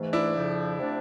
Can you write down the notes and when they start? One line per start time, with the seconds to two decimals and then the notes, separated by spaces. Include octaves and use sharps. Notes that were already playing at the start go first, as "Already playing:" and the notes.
Already playing: G#2 E3 A3
0.13 D4 E4
0.35 F2 C#3 F3
0.78 C3 F3 A3 D4